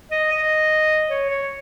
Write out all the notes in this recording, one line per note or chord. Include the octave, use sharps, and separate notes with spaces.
D#5
D#5
C#5
C#5